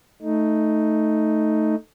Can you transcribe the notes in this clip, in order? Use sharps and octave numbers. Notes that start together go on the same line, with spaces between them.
A3 D#4